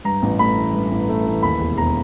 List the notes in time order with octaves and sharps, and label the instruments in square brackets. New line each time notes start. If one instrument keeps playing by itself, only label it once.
[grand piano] G2 A#5
A1
A3 B5
E3
G2
A1
A3
E3
D#2 B5
E1
E1 A#5